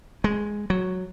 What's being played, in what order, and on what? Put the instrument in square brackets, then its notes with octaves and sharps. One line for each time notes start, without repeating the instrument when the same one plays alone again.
[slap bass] G#3
F#3